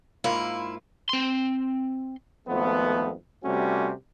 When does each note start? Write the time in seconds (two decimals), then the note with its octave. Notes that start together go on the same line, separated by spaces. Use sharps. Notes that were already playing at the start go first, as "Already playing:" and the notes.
0.24 G#2 A#3 E4 F4
1.09 C4 C6
2.48 G#1 F2 F3 A3 B3
3.44 C3 G3 A3 C4 C#4 F#4